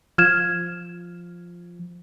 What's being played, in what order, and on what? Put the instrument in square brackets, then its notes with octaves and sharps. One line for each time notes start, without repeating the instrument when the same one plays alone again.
[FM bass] F3 [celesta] F6 G#6 E7